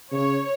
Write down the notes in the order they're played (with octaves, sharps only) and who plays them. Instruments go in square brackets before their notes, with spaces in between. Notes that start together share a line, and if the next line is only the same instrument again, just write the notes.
[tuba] C#3 [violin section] C#5